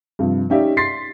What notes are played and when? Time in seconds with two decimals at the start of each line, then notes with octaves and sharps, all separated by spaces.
0.19 G2 C3 F3
0.50 C#4 D#4 G4 D5 E5
0.77 C6 A6 B6 C7